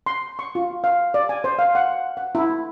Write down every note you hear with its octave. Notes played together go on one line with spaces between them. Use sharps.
C6
C#6
F4
F5
D5
G#5
C5
F5
F#5
F#5
E4